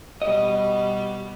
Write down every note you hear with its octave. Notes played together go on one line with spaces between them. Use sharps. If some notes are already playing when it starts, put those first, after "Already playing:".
B2 G3 D#5